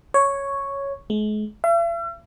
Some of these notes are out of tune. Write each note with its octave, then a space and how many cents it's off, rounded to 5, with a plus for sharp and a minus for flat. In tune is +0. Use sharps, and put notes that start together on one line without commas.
C#5 +0
G#3 +40
E5 +45